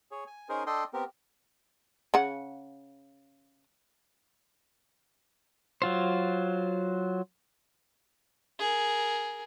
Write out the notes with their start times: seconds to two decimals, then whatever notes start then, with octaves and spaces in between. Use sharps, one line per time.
0.11 G#4 C#5
0.27 G#5
0.49 C#4 D#4 G#4 A#4 C5
0.67 D4 A4 D#5 G5 C6
0.93 B3 C4 G4 A#4
2.14 C#3 F#5
5.82 F#3 F4 C5
8.59 G#4 A#4